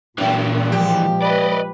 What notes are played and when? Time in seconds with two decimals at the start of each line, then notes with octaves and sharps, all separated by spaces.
0.18 F#2 A#2 E3 D4
0.72 F3 G#3 G4
1.23 B4 D5 D#5